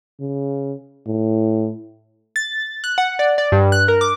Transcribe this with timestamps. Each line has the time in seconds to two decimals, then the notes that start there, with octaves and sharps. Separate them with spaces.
0.20 C#3
1.07 A2
2.36 A6
2.84 F#6
2.98 F#5
3.19 D5
3.38 D5
3.52 G2
3.72 F#6
3.88 A#4
4.01 D6